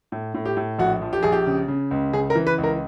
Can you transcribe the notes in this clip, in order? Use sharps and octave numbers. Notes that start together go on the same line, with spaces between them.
A2
A2
G4
A2
A#1 F#4
F3
G4
A#1 G#4
G4
C#3
C#3
C#2
C#3 G#4
A#4
E3
B4
C#2
A#4